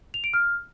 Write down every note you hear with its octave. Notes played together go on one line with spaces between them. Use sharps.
F7
D7
F6